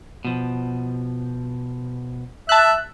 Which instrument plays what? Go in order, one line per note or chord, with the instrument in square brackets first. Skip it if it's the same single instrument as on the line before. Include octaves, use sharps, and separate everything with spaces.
[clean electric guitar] B2 F3
[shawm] E5 [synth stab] A5 F#6